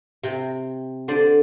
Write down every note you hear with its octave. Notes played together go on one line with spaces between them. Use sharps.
C3 G5
D3 C5 D5